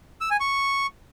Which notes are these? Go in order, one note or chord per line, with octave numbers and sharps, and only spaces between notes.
E6
G#5
C#6